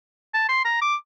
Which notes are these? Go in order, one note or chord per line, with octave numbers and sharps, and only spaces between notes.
A5
C6
A#5
D6